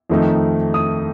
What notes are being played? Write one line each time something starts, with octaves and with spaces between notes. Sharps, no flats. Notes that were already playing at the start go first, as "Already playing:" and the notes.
F2 D#3 A3 D#4
D#6